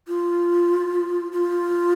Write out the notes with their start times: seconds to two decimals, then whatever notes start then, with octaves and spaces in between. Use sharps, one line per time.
0.08 F4
1.32 F4